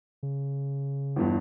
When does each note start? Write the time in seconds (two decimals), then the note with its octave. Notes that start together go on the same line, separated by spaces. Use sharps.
0.23 C#3
1.16 G1 E2 G2